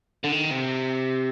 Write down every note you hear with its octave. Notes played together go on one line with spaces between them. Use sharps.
D3
D#3
C3